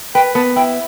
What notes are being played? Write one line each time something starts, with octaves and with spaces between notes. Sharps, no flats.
B4 G5
B3 A5
E4 G5